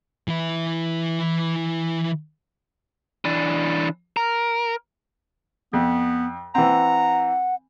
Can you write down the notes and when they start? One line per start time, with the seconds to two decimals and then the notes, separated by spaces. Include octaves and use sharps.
0.28 E3 E4
3.25 E3 D4
4.17 A#4
5.73 F2 B3
6.55 E3 C4 F#5 A#5